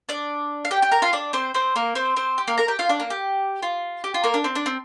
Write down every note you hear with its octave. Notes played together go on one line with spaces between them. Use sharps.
D4 D5
F5
G4 G5
G4 G5
A#4 A#5
F4 F5
D4 D5
C4 C5
C4 C5
A#3 A#4
C4 C5
C4 C5
G4
A#3 A#4
A#4 A#5
G4 G5
F4 F5
D4 D5
A#3 A#4
G4
F4
G4
F4
A#3 A#4
D4
C4
D4
C4